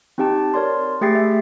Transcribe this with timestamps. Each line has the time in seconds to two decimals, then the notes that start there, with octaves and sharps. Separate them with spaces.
0.18 C4 D#4 G4 G5 A5
0.54 A#4 C#5 D5 C6
1.01 A3 G4 G#4 G5 A6 C7
1.15 E5